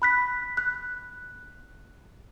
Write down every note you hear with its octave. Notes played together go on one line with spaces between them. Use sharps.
B5 F#6 B6
F#6